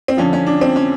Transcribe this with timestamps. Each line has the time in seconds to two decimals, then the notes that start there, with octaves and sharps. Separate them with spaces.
0.08 C4
0.17 F2 D3 F3 C#4
0.33 C#4
0.46 D4
0.61 C4
0.76 C#4